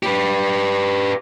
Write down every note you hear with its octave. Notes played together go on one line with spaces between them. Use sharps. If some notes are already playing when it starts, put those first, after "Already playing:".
G4 B4